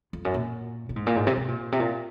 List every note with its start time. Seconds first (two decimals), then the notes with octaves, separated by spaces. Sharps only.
0.13 F2
0.25 F#2
0.34 A#2
0.89 A#2
0.96 G#2
1.07 A#2
1.16 G#2
1.27 C3
1.37 C3
1.48 A#2
1.72 C3
1.80 A#2